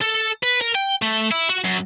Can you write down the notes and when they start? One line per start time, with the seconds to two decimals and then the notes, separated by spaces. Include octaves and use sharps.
0.01 A4
0.43 B4
0.61 A#4
0.75 G5
1.02 A3
1.31 E4
1.49 F#4
1.65 F#2